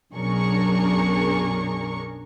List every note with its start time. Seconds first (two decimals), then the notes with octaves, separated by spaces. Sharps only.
0.13 B1 F#2 D4 G#4 A#4 C#6